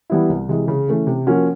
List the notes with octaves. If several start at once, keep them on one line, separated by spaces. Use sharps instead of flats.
E3 G3 B3 E4
C2
C3 E3 G#3
C#3
E3 A3 C#4
C3
F3 A#3 C#4 F#4